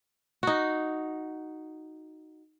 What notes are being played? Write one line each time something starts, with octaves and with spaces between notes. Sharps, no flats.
D#4 F#4